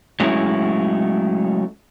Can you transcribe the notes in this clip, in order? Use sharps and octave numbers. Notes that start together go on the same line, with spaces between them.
F#3 G#3 A3 C#4 E4